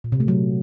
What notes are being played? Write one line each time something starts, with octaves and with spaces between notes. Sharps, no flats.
A#2
C3
A3
F#3